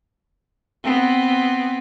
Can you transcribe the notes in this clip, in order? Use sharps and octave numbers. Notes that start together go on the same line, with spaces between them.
B3 C4